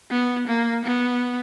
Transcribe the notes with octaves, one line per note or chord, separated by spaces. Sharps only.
B3
A#3
B3